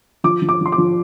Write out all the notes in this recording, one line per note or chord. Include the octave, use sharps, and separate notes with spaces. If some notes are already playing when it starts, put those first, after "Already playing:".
F3 D6
F3
D6
F3 C6
D6
F3